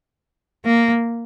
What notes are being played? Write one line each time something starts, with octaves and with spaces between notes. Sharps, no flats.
A#3